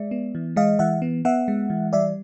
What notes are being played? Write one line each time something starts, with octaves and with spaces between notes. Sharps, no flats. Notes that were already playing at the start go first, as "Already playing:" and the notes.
Already playing: G#3 D5 E5
B3
E3
G#3 D#5 F5
E3 E5 F#5
B3
B3 E5 F#5
G#3
E3
G3 D5 E5